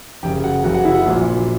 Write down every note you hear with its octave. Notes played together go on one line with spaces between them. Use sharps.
F#1 F#2 C#3 G4 G5
F#4 F#5
F#1 F#2 C#3 F#4 F#5
F#4 F#5
E4 E5
F#4 F#5
A#1 A#2 F#3